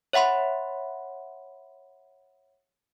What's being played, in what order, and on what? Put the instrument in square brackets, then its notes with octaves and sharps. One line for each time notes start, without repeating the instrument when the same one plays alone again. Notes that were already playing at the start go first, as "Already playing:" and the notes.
[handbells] C#5 E5 F#5 B5 C6